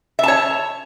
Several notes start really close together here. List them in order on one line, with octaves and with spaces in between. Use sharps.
E5 A5 C#5